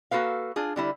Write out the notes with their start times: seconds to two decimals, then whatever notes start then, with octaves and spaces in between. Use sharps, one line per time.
0.11 A#3 F#4 A4 B4 F5
0.56 D4 F4 G#4
0.76 D3 G3 E4